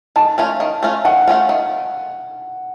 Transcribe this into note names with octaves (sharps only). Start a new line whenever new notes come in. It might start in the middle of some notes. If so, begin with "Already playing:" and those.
D#3 A5
A3 C#4 F4
D#3
A3 C#4 F4
D#3 F#5
A3 C#4 F4
D#3